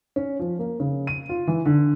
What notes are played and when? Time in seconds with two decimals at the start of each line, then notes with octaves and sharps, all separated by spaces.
0.16 C#4
0.39 F3
0.59 A#3
0.80 C#3
1.07 D#7
1.29 F4
1.47 E3
1.65 D3